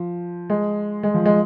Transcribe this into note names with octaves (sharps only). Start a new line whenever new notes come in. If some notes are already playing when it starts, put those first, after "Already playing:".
Already playing: F3
G#3
G#3
F3
G#3